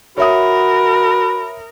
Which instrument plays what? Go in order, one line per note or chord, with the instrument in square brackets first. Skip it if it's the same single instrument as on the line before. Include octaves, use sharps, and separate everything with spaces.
[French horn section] F#4 [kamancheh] A#4 [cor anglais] B4 [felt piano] C#5 E5 D#6